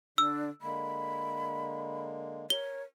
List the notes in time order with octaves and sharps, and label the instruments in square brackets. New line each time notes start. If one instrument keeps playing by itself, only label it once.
[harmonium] D3 [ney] D4 [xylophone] E6
[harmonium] D3 G#3 A#3 [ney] B5
[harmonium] A#4 [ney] C#5 [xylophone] G7